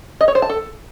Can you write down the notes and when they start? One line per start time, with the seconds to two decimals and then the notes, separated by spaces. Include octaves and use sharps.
0.21 D#5
0.28 C#5
0.35 C5
0.42 A5
0.49 A4